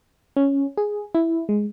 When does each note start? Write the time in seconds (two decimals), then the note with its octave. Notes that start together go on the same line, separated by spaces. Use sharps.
0.37 C#4
0.78 G#4
1.15 E4
1.49 G#3